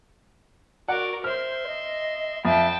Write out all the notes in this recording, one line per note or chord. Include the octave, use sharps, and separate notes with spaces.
F#4 A#4 D5 F#5
C5 E5 C6 F6
D#5
F2 E5 G5 A5